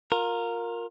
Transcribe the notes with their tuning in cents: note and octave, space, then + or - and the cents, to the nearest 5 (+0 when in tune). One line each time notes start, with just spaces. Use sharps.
F4 +25 A#4 -5